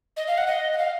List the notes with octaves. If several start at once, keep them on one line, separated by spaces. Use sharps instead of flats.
D#5
F5
F#5
D#5
F#5
F5